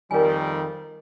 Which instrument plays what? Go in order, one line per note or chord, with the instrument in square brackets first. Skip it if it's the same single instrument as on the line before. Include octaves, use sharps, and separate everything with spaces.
[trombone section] F2 D#3 G3 [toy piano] A#4 G#5